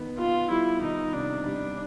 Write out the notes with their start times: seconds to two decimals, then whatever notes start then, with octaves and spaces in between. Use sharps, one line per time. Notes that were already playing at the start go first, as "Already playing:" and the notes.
Already playing: D#3 B3
0.18 B3 F4
0.50 G3 E4
0.81 D#3 D#4
1.13 C3 D4
1.45 G3 D4